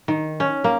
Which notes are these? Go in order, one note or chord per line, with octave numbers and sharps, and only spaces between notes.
D#3
C#4
A#3